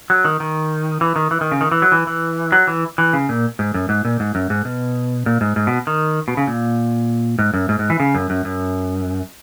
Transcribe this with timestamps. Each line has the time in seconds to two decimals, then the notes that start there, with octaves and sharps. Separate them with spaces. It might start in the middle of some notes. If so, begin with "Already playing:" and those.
0.10 F#3
0.25 D#3
0.40 D#3
1.01 E3
1.16 D#3
1.31 E3
1.41 D#3
1.52 C#3
1.61 D#3
1.72 E3
1.82 F#3
1.92 E3
2.07 E3
2.52 F#3
2.67 E3
2.98 E3
3.13 C#3
3.29 A#2
3.59 G#2
3.74 F#2
3.89 G#2
4.05 A#2
4.20 G#2
4.35 F#2
4.50 G#2
4.65 B2
5.26 A#2
5.41 G#2
5.56 G#2
5.67 B2
5.87 D#3
6.28 B2
6.37 C#3
6.47 A#2
7.39 G#2
7.54 F#2
7.69 G#2
7.79 G#2
7.90 E3
8.00 C#3
8.15 F#2
8.30 F#2
8.45 F#2